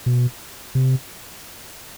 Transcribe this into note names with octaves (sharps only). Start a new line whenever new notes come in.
B2
C3